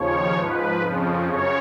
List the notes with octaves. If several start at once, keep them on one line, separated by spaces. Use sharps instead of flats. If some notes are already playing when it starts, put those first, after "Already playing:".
Already playing: D#2 C#3 F3 C#5
G#2 F3 B4
F2 C#3 F3
F#2 C#3 C#5